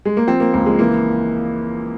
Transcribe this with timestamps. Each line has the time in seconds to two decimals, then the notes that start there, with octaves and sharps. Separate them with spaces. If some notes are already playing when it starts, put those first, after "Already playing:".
0.05 G#3
0.17 A#3
0.27 F3 C4
0.40 A#3
0.53 C#2 A#3
0.66 G#3
0.79 E3 A#3